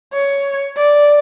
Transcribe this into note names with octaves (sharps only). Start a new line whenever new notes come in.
C#5
D5